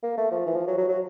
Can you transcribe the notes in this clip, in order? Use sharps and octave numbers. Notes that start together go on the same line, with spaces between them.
A#3
A3
F3
E3
F3
F#3
F#3
F#3